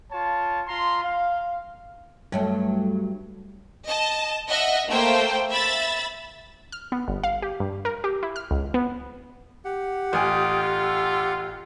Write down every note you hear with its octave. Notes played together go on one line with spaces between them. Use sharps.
F4 C#5 A5
F4 A#5 C6
F5
G2 F#3 G3 A3 C#5
D#5 A5
D#5 E5 F#5
A3 A#3 C5 G5
E5 B5 A6
F6
B3
G1
F5
G4
G2
A#4
G4
E4
F6
C#2
B3
G4 F#5
A1 F4 G5 G#5 D#6 G6
E6